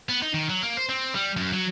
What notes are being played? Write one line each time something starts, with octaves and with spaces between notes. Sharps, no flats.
B3
D#4
D#3
F#3
A#3
C5
C4
G3
F#2
F#3